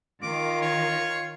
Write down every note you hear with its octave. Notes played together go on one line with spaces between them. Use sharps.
D#3 F4 D6
C#5